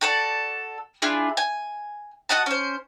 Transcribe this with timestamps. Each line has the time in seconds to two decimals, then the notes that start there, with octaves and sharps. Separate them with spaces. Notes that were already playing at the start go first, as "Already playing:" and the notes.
0.01 F#4 A4 D5
1.02 D4 E4 F4 G#4
1.37 G#5
2.29 F#4 D#5 F#5 A5
2.46 C#4 C5